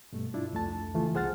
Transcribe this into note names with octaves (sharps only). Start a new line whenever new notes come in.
G2 B2 A3
D4 E4 F4
C2 F2 A3 A5
C#3 E3 F3 A3 F4
C2 G#4 C5 F#5 F6 A6